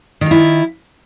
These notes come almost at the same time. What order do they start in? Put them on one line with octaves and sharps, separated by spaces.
D#3 F4 E4